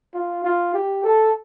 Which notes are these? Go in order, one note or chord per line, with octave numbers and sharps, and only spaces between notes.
F4
F4
G4
A4